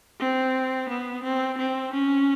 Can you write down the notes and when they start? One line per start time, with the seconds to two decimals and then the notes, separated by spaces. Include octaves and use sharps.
0.19 C4
0.89 B3
1.23 C4
1.58 C4
1.93 C#4